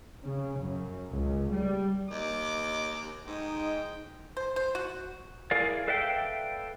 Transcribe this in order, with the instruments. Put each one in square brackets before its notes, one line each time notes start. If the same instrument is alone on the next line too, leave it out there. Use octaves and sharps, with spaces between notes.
[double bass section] C#3
F#2
C#2
G3
[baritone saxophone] D#2 [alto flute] D#5 [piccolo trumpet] D6
[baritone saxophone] G#2 [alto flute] D#4 [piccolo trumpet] G5
[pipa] C5
C5
F#4
[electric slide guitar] E4 G#4 A#4 D5 F5
A4 B4 D5 E5 F5 G5